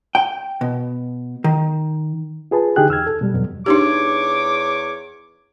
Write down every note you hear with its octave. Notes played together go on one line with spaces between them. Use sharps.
G5
B2
D#3
F4 G#4 B4 A5
D3 D#4 G4 G#4 G5 F#6
E2 E6 F6 G#6
A4
B2 G3
E2 G2 B2 F#3
E2 D4 D#4 G4 C#5 D6